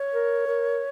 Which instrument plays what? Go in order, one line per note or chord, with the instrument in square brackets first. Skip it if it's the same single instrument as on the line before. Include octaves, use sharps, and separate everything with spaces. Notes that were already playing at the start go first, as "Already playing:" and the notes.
Already playing: [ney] C#5
[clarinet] A#4
A#4